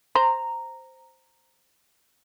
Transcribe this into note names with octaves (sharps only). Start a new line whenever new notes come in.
C5 A#5